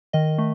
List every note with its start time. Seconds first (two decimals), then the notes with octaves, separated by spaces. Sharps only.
0.13 D#3 D#5
0.38 A3